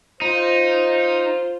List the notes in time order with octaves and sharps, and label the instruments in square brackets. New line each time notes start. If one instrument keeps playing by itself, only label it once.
[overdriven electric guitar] D#4 [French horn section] F4 C5